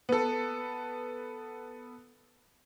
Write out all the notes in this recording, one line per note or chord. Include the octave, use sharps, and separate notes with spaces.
B3 A4